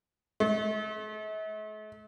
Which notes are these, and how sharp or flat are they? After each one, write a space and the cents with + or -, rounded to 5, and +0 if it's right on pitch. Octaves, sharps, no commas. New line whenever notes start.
A3 -45